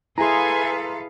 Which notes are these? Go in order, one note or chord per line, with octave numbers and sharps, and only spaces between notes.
E4 G#4 A4 B4 F5 G#5 A#5 C6